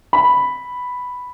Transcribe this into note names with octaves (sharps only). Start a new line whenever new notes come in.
B5